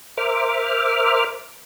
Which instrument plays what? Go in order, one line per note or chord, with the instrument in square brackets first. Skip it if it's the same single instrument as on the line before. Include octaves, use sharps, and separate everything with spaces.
[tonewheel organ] A#4 C5 E5 D6 F6